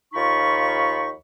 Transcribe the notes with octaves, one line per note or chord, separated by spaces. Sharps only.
D#2 F3 D#4 F4 B5 C#6